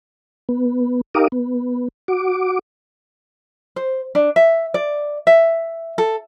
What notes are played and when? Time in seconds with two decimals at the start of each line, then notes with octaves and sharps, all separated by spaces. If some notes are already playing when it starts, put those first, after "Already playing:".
0.49 B3
1.15 D#4 G4 A#4 F5 D6 D#6
1.32 B3
2.08 F#4 D6
3.76 C5
4.15 D4
4.36 E5
4.74 D5
5.27 E5
5.98 A4